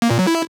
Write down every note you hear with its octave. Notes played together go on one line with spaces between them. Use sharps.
A#3
A#2
F#3
E4